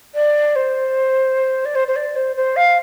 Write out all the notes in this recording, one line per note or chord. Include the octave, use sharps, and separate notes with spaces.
D5
C5
D5
C5
C5
D5
C5
C5
F5